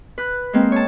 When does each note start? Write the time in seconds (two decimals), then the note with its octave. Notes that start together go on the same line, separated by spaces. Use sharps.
0.18 B4 F#6
0.53 G#3 A#3 C4
0.72 C#5 A5